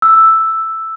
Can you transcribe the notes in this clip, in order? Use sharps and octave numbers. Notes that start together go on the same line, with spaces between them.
E6